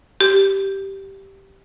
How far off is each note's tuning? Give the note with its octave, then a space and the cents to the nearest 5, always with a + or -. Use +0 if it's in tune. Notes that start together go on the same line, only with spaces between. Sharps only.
G4 -10